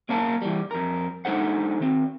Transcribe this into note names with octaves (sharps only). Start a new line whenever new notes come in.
B1 A#3 C#4 A#4 F5 A5
E3 G3
F2 A#4
G#3 D4 D#4 A4 C5 F#5
D#3 C4